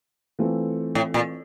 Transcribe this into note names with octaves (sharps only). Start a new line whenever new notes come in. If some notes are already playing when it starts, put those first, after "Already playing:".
E3 A3 C4 F4 A4
A2
A#2